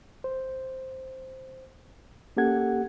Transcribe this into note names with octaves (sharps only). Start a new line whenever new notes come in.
C5
A#3 C#4 G4 A4 F#5 G#6